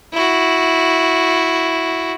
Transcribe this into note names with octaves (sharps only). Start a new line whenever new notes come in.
E4 F#4